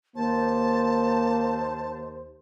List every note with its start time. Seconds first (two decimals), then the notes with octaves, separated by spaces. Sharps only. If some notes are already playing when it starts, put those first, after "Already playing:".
0.16 D#2 A#3 C5 A5